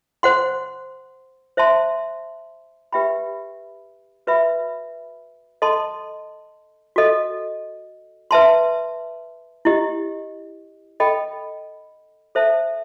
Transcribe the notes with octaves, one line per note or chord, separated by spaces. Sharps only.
C5 F#5 C6
C5 E5 A5 C6
G4 B4 E5 G5 B5
F#4 B4 E5 B5
A4 D#5 A5 C6
F#4 A4 D#5
B4 E5 A5 C6
E4 G4 D#5
A4 D#5 G5 B5
A4 C5 E5 A5